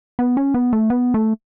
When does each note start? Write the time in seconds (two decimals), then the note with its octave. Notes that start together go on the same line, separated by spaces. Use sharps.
0.19 B3
0.37 C#4
0.54 B3
0.73 A3
0.90 B3
1.14 A3